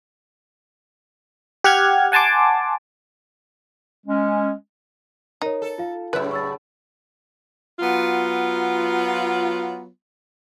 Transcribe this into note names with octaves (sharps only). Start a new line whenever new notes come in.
G4 F#5 F6 G#6
F#5 G#5 A5 C6 D6
G#3 C#4
D#4 A#4 C#5
A4
F4 F5
F#2 A2 C#3 B4 E5
C#6 E6 A6
F#3 B3 F4